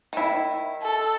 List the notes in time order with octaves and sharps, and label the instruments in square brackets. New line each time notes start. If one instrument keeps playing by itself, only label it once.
[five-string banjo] D#3 E4
[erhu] A4